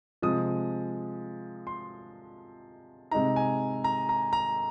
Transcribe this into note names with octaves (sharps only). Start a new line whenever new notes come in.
C3 F3 G#3 D#6
C6
C3 G#3 D#4 A#5
G#5
A#5
A#5
A#5